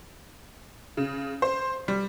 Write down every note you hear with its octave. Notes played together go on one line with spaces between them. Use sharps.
C#3
C5
G3